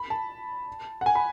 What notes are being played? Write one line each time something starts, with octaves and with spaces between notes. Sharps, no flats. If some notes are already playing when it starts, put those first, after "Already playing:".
Already playing: B5
A5
F#5
G#5
B5